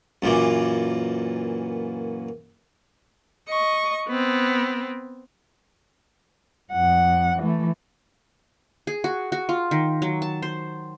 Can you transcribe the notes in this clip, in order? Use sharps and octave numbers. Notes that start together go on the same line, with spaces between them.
F#2 A#2 E3 D6
D#5 C#6
B3 C4
F2 F#5
E3 A3
G#4
F#4
F#4
F4
D#3
F#3
A5
C5